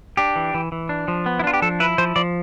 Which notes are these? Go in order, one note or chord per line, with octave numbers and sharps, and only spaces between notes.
D4 G4
E3
E3
E3
D4
F3
B3
E4
D4 F4
G4
F3 A4
E4 B4
F3 C5
F3 D5